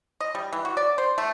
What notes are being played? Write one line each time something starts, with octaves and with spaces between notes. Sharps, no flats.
D#5
G3
E3
F#4
D5
C5
A3